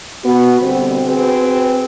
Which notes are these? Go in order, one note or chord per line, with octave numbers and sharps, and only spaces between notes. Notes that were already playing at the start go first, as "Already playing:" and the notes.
B3 F#4
B2 D3 G3 C4
C4 F#4 G#4 B4